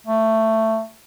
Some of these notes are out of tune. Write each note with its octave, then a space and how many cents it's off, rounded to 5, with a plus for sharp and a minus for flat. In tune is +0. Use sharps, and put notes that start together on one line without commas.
A3 +10